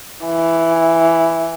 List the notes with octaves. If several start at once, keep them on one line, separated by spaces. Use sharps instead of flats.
E3